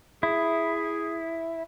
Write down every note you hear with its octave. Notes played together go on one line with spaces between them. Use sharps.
E4 G#4